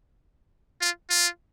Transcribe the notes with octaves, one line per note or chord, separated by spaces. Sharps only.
F4
F4